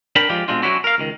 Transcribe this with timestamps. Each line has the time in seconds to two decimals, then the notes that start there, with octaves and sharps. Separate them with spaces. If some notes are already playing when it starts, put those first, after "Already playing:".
0.16 D4 A#4 G5 B5
0.30 F3 G#3 F4 G4
0.48 B2 G#3 C4 D4 F4
0.63 F#3 A#3 C#4 D4 E4 F#4
0.84 A#4 F5
0.98 C#2 D#3